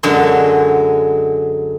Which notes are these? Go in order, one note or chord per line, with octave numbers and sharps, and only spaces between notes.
F#2 D3 F#3 G#3